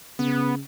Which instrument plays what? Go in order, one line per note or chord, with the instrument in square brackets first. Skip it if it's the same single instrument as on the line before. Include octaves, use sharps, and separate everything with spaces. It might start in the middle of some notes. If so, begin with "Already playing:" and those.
[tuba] C#3 [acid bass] B3